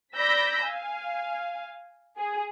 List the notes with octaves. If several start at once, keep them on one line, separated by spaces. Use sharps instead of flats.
D5 B5 E6 G6 A#6 B6
F5 G#5
G#4